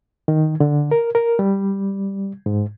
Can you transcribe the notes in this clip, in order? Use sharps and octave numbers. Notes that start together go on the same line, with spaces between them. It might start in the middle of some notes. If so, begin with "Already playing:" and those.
D#3
D3
A#4
A#4
G3
G#2